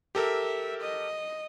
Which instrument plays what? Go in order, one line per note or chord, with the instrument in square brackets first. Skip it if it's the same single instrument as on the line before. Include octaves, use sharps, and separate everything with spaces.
[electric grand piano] G4 A4 A#4 [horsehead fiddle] E5
[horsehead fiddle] D#5